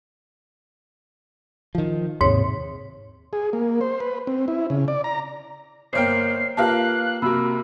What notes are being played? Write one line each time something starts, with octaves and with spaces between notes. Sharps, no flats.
D#3 F3
D#2 G#2 C3 C#5
G#4
A#3
C5
B4
C4
E4
C#3
D5
A#5
G1 A#3 C5 C#5 G5 F6 C7
A#3 F4 G4 B4 F5 A5 F#6
C3 A#3 F#4 B5 E6